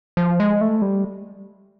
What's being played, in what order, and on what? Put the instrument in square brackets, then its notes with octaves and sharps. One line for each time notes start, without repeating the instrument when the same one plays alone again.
[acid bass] F3
G#3
A3
G3